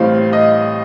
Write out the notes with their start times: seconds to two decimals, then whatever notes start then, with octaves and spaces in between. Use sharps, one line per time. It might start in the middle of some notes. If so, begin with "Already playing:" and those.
Already playing: A1 A2 G3 C4 F5
0.33 D#5